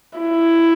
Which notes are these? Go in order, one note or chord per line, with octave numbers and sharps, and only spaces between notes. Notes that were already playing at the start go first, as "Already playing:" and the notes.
E4